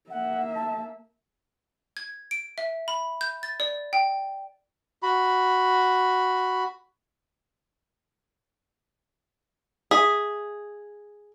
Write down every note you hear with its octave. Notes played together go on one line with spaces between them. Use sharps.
A#3 E5 F#5
A5
G#6
D7
E5
B5
G6
A6
D5
G5
F#4 B5
G#4 E5 D#6 B6